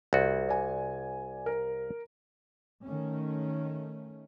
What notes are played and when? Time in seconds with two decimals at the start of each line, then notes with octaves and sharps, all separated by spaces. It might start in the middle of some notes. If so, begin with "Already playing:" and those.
0.13 C2 F#4
0.49 D5 G#5
1.46 A#4
2.83 D#3 A3 C#4